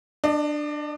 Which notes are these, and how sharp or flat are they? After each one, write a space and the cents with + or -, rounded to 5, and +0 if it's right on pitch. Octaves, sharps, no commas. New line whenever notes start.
D4 +15 D#5 -30